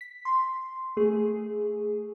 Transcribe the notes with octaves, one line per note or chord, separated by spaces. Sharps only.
B6
C6
A3 G#4